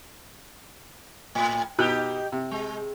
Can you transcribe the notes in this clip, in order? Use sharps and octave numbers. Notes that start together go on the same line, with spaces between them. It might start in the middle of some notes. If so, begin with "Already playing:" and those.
A2
B2 D#4 G4 F#6
C3
G#3